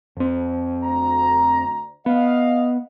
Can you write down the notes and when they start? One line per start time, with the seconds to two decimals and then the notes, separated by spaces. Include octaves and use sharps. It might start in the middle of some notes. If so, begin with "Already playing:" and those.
0.17 F2 C4
0.84 D2 A#5
2.06 B3 D#5 F5